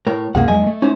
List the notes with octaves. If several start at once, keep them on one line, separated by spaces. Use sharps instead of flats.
A2 A#4 C#5
C#2 F#2 C3 A#3 G#4 F#5
F2 F#3 G#3 D#5 G#5
A3
C#4 D#4 C5